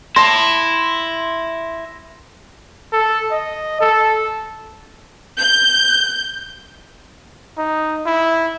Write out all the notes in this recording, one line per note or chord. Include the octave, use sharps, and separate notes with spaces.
E4 A5 C6 A#6
A4
D#5
A4
G6
D#4
E4